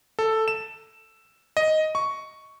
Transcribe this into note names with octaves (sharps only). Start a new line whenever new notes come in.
A4
E7
D#5
C#6